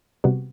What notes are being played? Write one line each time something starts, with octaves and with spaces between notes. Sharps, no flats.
C3 G3 B3 F#4